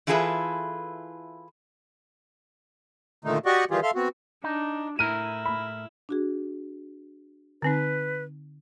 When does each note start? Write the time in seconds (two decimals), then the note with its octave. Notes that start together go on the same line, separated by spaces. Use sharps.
0.07 E3 E4 F4 G#4 A4 B4
3.25 A#2 D3 D#3 A3 D#4
3.46 F#4 G4 D5 D#5 F#5 C#6
3.71 D#3 E3 G3 F4 G4 G#4
3.83 A4 E5 F5 C6 F6
3.95 B3 C4 F#4
4.44 D4 D#4
4.99 A2 E4 A#4 D#7
5.46 B5
6.09 D4 F#4 G#4
7.62 D3 C4 D#4 B4